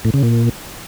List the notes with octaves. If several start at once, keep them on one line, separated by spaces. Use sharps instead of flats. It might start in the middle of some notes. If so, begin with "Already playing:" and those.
A2
C#3
A#2